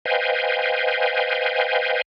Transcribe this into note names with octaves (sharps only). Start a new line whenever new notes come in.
B4 C5 D#5 F5 G5 G#5